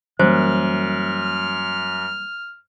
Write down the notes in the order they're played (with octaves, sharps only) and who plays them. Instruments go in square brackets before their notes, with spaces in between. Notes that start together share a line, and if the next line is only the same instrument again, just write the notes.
[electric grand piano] F#2 [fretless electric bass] E3 G3 A#3 [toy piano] C5 [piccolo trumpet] F6